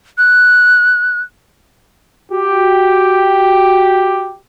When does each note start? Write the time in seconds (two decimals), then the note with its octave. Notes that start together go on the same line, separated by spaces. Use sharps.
0.18 F#6
2.32 F#4 G4